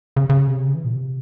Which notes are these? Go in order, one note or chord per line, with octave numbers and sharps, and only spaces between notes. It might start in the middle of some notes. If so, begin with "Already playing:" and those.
C#3
C#3
C3
C#3
E3
A#2
C3